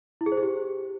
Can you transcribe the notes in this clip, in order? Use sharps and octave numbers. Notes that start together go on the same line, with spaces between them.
E4
G#4
C5
G#4
G4